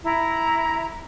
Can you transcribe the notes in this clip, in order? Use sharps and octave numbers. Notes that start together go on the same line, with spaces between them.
E4 A#5